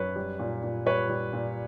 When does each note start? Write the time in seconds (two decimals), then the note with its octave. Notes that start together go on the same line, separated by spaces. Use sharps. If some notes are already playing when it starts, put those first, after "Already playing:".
Already playing: F#2 B4 C#5
0.16 G3
0.39 A#2
0.63 A#2
0.86 G3 B4 C#5
1.09 G3
1.33 A#2